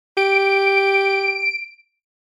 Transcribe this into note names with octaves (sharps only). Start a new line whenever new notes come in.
G4 D7